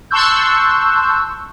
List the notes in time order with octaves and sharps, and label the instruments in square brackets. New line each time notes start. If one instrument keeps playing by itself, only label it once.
[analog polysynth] A5 C6 C#6 E6 F#6 G6